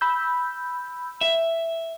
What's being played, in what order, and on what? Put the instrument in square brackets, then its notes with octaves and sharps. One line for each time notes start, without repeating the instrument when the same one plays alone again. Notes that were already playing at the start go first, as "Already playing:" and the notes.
[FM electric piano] B5 E6 G6
[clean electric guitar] E5